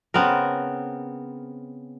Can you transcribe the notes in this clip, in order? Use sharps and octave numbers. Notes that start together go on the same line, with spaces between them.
C#3 B3 C4 A#4